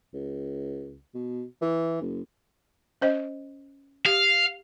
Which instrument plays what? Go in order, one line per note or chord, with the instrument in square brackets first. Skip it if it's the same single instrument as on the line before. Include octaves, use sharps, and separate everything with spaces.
[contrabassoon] C#2
B2
E3
F#1
[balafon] C#4 C5 D#5
[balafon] G4 [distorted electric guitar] F5